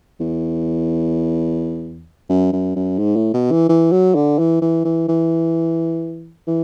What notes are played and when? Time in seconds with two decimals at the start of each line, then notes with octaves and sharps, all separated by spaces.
0.20 E2
2.29 F#2
2.53 F#2
2.76 F#2
2.98 G#2
3.16 A2
3.34 B2
3.51 E3
3.69 E3
3.92 F#3
4.15 D3
4.39 E3
4.62 E3
4.85 E3
5.08 E3
6.47 E3